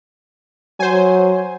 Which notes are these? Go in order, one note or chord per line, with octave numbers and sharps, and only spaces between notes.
F#3 C5 G#5